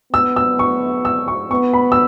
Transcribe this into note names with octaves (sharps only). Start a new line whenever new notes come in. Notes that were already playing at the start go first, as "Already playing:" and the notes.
B3 E6
E6
C#6
E6
C#6
B3 C#6
B5
E6